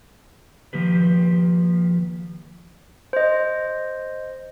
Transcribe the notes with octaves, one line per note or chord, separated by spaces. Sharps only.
D#3 F3 A#3 G4 B4
C5 D#5